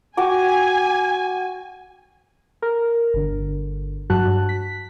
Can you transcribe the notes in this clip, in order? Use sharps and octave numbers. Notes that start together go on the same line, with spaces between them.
F#4 G5 G#5 D6
A#4
G1 D3
G2 F#3 F#4 A5 F#6
B6